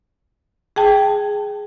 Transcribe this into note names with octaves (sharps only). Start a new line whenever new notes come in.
G#4 G5 A5